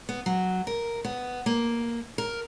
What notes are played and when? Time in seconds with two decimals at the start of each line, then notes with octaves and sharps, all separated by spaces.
0.09 B3
0.26 F#3
0.67 A#4
1.05 B3
1.46 A#3
2.18 A#4